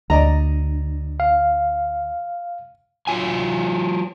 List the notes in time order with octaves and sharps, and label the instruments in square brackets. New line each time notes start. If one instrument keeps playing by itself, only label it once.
[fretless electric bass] D2 [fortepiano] D5 D#5 A#5
[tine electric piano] F5
[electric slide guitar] F#3 F4 G#5